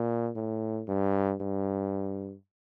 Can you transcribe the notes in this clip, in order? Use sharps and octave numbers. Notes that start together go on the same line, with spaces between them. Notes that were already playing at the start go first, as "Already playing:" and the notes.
Already playing: A#2
A2
G2
G2